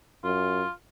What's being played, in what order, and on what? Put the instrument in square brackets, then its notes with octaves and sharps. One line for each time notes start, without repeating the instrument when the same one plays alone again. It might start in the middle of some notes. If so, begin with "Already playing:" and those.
[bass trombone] F#2 [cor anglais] F4